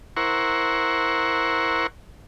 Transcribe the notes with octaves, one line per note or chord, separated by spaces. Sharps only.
E4 A#4 C5 F#5 C#6